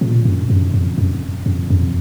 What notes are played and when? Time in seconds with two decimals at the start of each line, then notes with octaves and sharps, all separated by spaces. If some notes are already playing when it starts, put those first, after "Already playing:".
0.01 A#2
0.25 F#2
0.50 F#2
0.74 F2
0.98 F#2
1.46 F2
1.70 F2